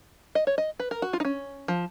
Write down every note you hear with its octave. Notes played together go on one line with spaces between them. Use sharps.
D#5
C#5
D#5
B4
A#4
F#4
F4
D#4
C#4
F3